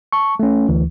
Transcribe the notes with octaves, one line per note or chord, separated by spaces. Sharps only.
A5 C#6
A3 C#4
D2 E3